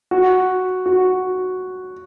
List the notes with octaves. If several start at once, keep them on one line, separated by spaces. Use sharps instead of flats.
F#4
F#4